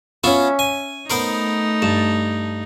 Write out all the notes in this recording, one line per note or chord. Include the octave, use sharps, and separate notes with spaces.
B3 C#4 F4 F#4 E5
G#5
A3 B3 D#4 A#4 C5
G2 A5